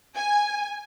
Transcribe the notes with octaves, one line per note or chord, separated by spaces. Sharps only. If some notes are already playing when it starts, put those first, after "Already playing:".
G#5